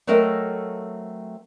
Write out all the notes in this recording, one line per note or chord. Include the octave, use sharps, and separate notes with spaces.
F#3 A3 C4 A4 A#4 D#5